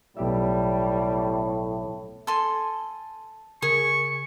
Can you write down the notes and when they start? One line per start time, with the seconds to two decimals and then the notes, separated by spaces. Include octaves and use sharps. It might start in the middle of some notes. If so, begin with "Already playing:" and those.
0.17 B1 A2 G3 G4 E5
2.27 A4 G#5 C6
3.62 C#3 G#4 A#4 C#6